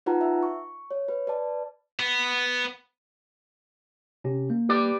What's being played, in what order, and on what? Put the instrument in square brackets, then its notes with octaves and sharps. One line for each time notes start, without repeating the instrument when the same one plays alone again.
[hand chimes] D#4 F4 B4 F#5 A5 A#5
E5
C#6
C#5
B4
B4 D5 A5
[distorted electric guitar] B3
[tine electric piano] C3 C#4 G4
A#3
[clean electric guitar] G4 B4 D5